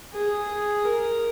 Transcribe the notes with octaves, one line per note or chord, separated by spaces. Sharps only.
G#4
G#4
A#4